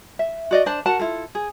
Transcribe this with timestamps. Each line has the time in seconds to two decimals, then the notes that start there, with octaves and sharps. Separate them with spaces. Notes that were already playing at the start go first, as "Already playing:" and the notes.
0.19 E5
0.51 F#4 D5 D#5
0.66 D4 C5 D5 A5
0.86 F#4 A#4 F#5 A5
0.99 E4 F4 A4
1.35 G#4